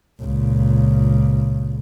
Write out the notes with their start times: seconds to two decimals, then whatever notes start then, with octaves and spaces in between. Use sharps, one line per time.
0.21 C#2 A#2